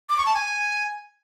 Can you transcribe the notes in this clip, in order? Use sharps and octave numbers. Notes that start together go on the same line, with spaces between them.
D6
C#6
A5
G#5